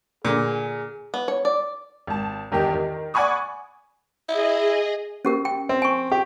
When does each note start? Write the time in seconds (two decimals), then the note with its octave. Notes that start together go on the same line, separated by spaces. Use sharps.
0.25 A#2 D3 G#4
1.14 B3
1.28 C#5
1.45 D5
2.07 G#1 A5
2.51 G1 E2 D#3 G4
2.74 D#3
3.14 D5 F#5 G#5 B5 C#6 D#6
4.29 E4 G#4 D#5
5.25 C#4 G4 A#4
5.45 G5
5.69 C4
5.82 G#5 C#6
6.12 G4